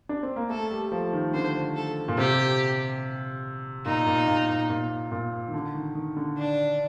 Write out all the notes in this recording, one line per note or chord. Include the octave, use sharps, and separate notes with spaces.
D4
C4
A#3
A3 A4
G3
F3
D#3
D3 C5
A4
A#2
C3 G4
A#2 D#4
A#2
A#2
A#2
A#2
A#2
D#3
D3
D#3
D#3
D3
D4